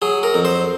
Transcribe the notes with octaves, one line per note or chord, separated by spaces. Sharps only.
F#3 G#4
A#4
F2
C5